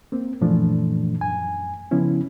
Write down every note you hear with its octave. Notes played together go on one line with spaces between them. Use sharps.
A#3 C4
F#2 A#2 E3 F3 A3 D4
F#2 G#5
C#3 F3 B3 C#4 E4